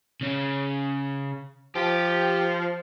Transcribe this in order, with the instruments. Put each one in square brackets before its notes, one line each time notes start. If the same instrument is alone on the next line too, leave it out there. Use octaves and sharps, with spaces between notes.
[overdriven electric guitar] C#3 C#4
[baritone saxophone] F3 [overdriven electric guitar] G4